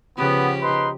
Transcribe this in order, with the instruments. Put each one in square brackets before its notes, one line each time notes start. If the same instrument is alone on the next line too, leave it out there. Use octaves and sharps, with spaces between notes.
[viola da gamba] C#3 F3 G4 [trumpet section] B3
[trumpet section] D#4 B4 C6